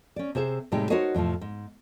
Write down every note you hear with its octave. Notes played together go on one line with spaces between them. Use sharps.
C#4 D5
C3 G#4 C5 E5
A2 C3 G3 G#3 D#4 G4
D#4 F#4 A#4 C5 C#5 D#5
F2 A2 C3 F3
G#2